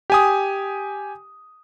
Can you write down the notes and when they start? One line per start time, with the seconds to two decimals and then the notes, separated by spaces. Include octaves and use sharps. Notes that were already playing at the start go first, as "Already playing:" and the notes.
0.10 G4 G#5 D#6